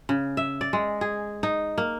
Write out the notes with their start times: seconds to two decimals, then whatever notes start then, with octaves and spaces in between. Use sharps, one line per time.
0.09 C#3
0.37 E5
0.61 D5
0.73 G#3
1.01 G#4
1.43 D#4
1.78 A#3